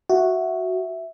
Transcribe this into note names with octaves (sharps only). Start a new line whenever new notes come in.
F#4 E5